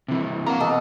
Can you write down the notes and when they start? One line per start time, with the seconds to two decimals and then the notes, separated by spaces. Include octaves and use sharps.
0.08 C3 E3
0.46 A#3 F#5 A#5
0.60 B2 A4 D#5